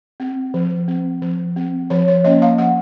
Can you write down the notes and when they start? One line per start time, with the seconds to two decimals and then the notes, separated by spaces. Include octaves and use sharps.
0.20 C4
0.54 F3
0.88 C4
1.22 F3
1.56 C4
1.90 F3 C#5
2.08 C#5
2.24 A#3 C#4 D#5
2.42 F5
2.58 F3 F#5